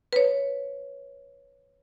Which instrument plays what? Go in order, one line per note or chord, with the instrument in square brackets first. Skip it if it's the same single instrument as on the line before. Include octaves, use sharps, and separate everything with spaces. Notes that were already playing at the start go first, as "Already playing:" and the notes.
[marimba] B4 C#5